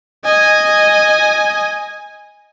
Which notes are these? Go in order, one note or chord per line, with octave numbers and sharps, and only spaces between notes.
D#5 G#5